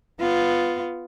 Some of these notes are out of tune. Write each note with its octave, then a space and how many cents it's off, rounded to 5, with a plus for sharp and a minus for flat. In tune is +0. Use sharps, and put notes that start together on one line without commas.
B3 +10 F4 +0